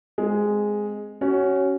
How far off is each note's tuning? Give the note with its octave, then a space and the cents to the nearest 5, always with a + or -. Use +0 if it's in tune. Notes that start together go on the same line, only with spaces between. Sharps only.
G#3 +0 C4 -10 D#5 +0
C#4 +0 F#4 +25 C#5 +0